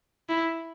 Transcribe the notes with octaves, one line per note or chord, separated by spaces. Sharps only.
E4